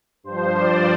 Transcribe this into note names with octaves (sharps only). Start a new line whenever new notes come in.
G2 F3 C5
D5